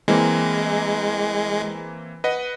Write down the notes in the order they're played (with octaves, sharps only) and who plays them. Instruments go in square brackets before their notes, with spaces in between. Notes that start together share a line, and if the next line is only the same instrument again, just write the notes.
[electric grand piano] E3 A#3 C4 [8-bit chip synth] G#3
[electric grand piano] B4 D#5 F#5